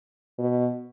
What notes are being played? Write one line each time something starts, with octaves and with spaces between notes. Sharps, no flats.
B2